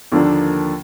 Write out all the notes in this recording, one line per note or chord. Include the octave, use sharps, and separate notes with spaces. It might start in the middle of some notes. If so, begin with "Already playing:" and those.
D#2 D3 F3 A#3 D4